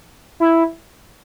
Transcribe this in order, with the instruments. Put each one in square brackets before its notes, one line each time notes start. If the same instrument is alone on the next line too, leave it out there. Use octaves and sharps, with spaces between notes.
[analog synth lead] E4